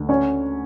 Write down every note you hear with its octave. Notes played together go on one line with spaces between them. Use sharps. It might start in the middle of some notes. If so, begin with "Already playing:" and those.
Already playing: D2
C#4 C#5